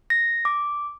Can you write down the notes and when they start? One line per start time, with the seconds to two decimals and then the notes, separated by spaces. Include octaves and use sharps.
0.10 A#6
0.45 D6